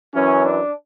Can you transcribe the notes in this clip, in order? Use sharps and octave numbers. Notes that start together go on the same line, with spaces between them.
F#2 E3 C#4
D4